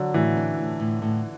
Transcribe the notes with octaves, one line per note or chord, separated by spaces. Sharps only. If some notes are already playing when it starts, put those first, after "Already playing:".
Already playing: D3 F#3 D4
A2 E3
D4
A2
A2
A2